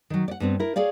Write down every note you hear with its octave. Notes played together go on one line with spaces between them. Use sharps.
D#3 F#3
D5 F#5
G2 B3 C4
E4 A#4
G#4 C#5 D5 F5